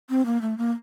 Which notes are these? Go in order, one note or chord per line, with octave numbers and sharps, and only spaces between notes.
C4
A#3
A3
A#3